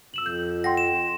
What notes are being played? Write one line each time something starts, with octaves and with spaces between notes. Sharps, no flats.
F2 E6 E7 F#7
G6
F#5 G5 C6 A#6
E7